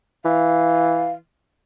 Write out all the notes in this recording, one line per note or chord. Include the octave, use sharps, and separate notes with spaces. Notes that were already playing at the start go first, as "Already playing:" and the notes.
E3 F5